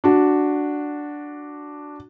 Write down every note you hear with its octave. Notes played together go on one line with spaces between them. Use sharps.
D4 F#4